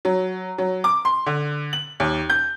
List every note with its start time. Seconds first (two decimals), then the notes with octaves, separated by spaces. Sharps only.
0.05 F#3
0.58 F#3
0.84 D6
1.05 C6
1.26 D3
1.73 F#7
2.00 D#2
2.30 G6